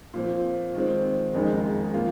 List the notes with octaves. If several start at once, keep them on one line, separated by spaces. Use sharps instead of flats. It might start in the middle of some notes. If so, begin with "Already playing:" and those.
A#2 F3 C4
D#3 G#3 C4
F#1 F2 D#3 G#3 D#4
F3 A#3 F4